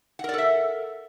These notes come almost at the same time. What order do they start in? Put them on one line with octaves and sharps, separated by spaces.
F#5 A#4 D5 A4 E5